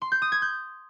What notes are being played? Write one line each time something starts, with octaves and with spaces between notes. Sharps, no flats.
C6
G6
D#6
G#6
G6